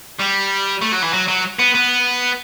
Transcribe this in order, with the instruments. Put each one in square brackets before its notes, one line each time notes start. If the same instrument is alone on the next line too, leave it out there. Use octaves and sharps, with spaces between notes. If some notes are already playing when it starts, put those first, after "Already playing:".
[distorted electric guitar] G3
A3
F#3
E3
F#3
F#3
B3
B3